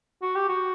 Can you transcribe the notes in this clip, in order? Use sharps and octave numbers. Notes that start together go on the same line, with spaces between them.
F#4
G4
F#4